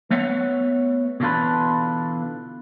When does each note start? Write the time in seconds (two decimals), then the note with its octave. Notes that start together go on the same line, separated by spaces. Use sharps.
0.11 A3 B3 C#5 E5 F#5
1.20 B2 D3 E3 F4 A4 B4